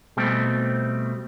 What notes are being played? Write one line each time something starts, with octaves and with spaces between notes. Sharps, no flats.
B2 G3 A3 C4